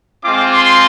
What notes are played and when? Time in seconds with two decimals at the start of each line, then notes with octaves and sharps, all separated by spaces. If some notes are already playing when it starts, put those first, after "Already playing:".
0.23 G#3 C4 F4 D6
0.53 C6